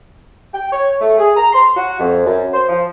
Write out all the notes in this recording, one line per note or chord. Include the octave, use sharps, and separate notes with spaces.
G5
C#5
A3
G#4
A#5
C6
F#4
F2
F#2
C5
F3